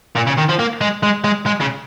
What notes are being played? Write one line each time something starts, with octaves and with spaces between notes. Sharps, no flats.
A#2
C#3
D#3
F3
A#3
G#3
G#3
G#3
G#3
C#3